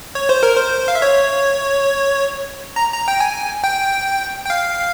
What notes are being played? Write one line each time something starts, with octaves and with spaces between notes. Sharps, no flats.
C#5
C5
A#4
C5
F5
E5
C#5
A#5
A#5
G5
G#5
G5
G5
F5